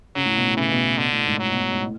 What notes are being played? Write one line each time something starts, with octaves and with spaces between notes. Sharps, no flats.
C#3 F#3
A2
B2
A2
C#3 E3
B2
B2 D3
A2
G#2
A2 F#3
B2
A2
G#2
A2